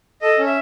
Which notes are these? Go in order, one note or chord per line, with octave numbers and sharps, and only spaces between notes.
A4 D#5
C#4
E5